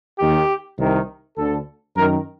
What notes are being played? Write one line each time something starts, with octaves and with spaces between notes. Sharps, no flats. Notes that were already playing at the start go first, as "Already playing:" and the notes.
D#2 D#3 G4
C2 C3 D#3
D2 D3 A4
F#2 D#3 A#4